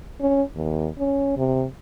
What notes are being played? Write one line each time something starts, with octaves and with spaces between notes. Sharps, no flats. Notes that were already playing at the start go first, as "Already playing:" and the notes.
C#4
D#2
C#4
C3